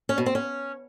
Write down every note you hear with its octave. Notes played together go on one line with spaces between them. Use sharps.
C#4
B2
C4
C#4